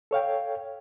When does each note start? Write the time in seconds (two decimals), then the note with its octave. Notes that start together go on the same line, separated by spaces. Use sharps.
0.11 A4 C#5 F5 G5